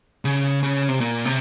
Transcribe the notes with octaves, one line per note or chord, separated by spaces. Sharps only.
C#3
C#3
C3
A#2
C3